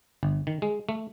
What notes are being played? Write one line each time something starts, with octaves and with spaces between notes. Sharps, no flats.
G1
D#3
G#3
A3